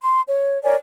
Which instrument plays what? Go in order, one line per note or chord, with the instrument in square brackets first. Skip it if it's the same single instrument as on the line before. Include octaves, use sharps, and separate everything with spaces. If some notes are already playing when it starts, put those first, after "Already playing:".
[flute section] C6
C#5
A#4 C#5 D5 G#5